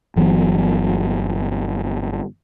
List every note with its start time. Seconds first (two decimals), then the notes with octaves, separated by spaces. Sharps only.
0.16 G1 E3 F#3 B3